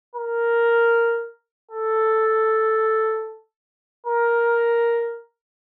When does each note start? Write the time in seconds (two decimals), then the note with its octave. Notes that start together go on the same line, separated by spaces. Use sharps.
0.16 A#4
1.71 A4
4.07 A#4